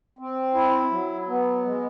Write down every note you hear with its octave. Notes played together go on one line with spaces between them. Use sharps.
C4
E4
F#3
B3
G#3